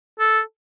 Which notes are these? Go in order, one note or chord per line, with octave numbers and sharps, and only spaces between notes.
A4